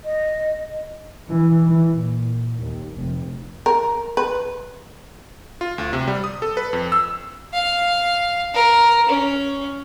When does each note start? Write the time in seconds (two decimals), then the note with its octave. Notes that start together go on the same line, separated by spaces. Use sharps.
0.05 D#5
1.28 E3
1.65 E3
1.97 A#2
2.60 D#2
2.95 F1
3.66 A#4
4.17 B4
5.61 F4
5.78 D2
5.93 C3
6.08 G3
6.24 D#6
6.42 A4
6.57 B4
6.73 F2
6.92 E6
7.53 F5
8.54 A#4
9.08 C#4